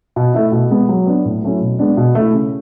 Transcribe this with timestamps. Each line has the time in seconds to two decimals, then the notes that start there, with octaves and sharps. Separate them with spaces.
0.16 B2
0.34 A3 E4
0.52 B2
0.71 G#3 B3
0.89 F#3
1.07 B3 D4
1.25 A2
1.43 F#3 A3 C#4 E4
1.61 B2
1.79 G#3 B3 D4
1.97 B2
2.15 A3 E4
2.33 C#3